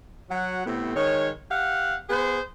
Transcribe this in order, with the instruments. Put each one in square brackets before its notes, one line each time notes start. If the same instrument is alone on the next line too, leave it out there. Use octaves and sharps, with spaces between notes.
[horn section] F#3 F#5
A2 C3 A3 B3 C4
D#3 G#3 C#5
G4 F5 F#5
B3 G#4 B4 C5